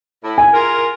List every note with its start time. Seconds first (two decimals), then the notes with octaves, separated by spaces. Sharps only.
0.24 A2 E4
0.38 G#5
0.54 F4 G#4 A#4